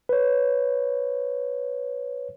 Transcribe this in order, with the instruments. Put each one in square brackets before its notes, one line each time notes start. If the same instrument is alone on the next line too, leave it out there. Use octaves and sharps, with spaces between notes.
[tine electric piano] B4 C#5